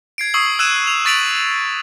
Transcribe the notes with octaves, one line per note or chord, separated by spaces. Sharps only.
G#6 C7 D7
C#6 D#6 E6 C7 F#7
E6 F#6 G#6 D#7 E7
F7
C#6 A6 B6 D7 F7 F#7